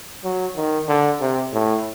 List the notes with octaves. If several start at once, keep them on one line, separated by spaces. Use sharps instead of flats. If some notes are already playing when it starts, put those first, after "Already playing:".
F#3
D#3
D3
C3
A2